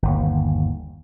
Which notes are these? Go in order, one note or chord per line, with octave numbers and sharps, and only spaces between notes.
G1 D#2